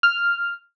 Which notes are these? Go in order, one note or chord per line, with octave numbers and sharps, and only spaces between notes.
F6